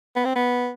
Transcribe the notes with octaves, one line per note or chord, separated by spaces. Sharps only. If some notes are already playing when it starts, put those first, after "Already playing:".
B3
C4
B3